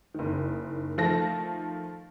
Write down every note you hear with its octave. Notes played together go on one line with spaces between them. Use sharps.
F#1 D#3
D#3 F3 A3 A5 A#6